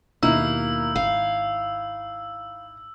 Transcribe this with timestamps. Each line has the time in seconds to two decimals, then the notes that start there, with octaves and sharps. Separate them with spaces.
0.23 D#2 B2 A#3 D#4 E4 E6
0.96 G#1 F5